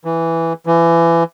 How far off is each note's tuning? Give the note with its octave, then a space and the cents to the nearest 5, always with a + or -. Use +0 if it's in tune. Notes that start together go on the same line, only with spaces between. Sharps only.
E3 +0
E3 +25